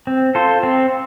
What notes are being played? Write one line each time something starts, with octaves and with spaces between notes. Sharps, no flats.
C4
F4 A4 C5
C4